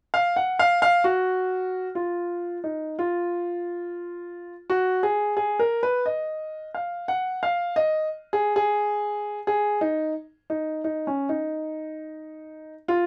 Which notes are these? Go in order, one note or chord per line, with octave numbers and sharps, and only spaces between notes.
F5
F#5
F5
F5
F#4
F4
D#4
F4
F#4
G#4
G#4
A#4
B4
D#5
F5
F#5
F5
D#5
G#4
G#4
G#4
D#4
D#4
D#4
C#4
D#4
F4